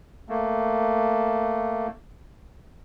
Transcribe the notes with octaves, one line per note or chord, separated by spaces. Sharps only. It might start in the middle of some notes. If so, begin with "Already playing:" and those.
A3 A#3